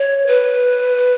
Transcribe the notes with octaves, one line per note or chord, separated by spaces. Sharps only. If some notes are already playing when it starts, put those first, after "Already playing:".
Already playing: C#5
B4